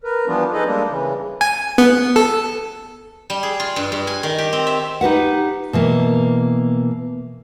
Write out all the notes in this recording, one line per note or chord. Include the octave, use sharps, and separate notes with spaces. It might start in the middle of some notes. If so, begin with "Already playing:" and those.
A#4 B4
E3 F3 G3 B3 D4 F4
D#4 G#4 A4 B4 D#5
G3 G#3 A#3 D4
C#3 E3
G#5
B3
A4
G3
G#4
F4
G2
G2
G#5
D#3
G4
C4
E5
D#4 G4 B4 F#5
B2 E3 A#3